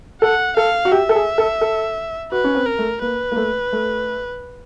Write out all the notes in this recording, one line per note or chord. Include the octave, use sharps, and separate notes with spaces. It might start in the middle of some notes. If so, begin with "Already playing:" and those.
A4 F#5
A4 F5
F#4
G4 E5
A4
G#4
A4
A4
F#4 B4
C#4
C4
A#4
A3
A#3 B4
A#3
A3
A3